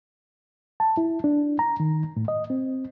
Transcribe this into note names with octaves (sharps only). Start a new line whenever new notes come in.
A5
E4
D4
A#5
D#3
A2
D#5
C4